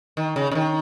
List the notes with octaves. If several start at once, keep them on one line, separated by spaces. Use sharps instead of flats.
D#3
C#3
C#3
D#3